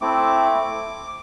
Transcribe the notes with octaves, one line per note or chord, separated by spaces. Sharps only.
A3 C4 E4 D6